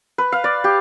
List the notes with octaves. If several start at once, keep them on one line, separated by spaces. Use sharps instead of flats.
B4
F5
D5
G4